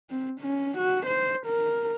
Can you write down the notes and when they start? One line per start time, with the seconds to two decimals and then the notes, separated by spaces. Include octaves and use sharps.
0.10 C4
0.40 C#4
0.78 F#4
1.06 C5
1.46 A#4